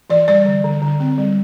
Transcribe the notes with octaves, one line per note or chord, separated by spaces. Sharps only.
E3 D5
G3 D5
D3
D3
D3
C4
G3